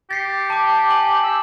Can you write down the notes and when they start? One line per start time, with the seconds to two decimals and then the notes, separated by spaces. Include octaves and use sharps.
0.11 G4 A6 C7 C#7
0.50 A5 D6
0.90 G#5 F#7
1.24 E6